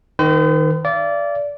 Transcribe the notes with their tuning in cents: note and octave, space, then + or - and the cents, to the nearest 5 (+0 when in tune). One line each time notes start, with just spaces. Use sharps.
D#3 +0 C5 -45
D5 -20 F5 -45